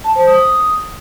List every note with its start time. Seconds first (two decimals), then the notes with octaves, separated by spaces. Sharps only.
0.04 A5
0.16 C5
0.27 D#6